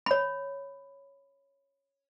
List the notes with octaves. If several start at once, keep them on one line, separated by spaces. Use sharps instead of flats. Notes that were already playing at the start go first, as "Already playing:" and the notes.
C#5 B5